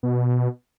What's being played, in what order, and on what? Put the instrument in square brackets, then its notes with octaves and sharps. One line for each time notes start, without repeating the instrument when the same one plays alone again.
[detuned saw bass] B2